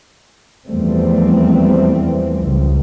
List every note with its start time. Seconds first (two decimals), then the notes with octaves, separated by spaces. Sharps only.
0.66 E2 F3 G3 A3 C4
2.45 C#2